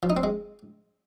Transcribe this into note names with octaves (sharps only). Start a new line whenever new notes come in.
F3
D#4
C4
G#3